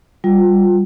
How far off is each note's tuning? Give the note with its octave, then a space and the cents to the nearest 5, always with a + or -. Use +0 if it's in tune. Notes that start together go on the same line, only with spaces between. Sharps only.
G3 +0 F4 +20